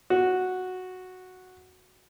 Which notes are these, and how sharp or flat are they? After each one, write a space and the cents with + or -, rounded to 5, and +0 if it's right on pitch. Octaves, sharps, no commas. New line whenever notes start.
F#4 -5